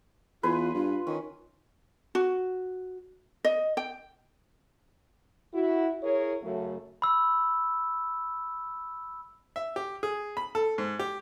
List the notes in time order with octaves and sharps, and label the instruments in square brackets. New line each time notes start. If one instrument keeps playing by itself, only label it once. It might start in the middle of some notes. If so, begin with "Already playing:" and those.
[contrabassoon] E2 [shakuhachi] F4 [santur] B4 G#5 C6
[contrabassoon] G2 [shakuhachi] F4
[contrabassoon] D#3 [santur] C#4
[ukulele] F#4
D#5
G5
[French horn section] E4 F#4
E4 G#4 A#4 C#5
F#2 C#3 F#3 A3
[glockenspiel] B5 E6
[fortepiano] E5
G4
G#4
B5
A4
G#2
G4